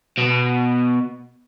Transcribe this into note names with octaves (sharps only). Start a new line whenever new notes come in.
B2